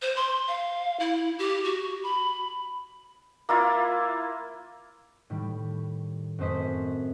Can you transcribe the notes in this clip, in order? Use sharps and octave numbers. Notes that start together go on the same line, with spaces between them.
C5
C6
F5
E4
G4
F#4
B5
A#3 E4 F4
A2 D#3 G3
F#2 A3 C4 C5 D#5 B6